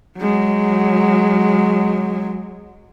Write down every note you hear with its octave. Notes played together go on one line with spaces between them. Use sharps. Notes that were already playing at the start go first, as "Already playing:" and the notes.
F#3 G#3